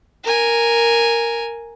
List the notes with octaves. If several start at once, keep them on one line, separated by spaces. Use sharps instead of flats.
A#4 G#5